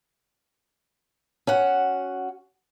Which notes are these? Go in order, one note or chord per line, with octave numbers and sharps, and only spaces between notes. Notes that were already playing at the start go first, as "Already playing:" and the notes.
C#4 F#4 F#5